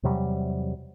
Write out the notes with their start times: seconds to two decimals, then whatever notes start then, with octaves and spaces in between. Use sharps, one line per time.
0.03 E2 C3 F#3 G3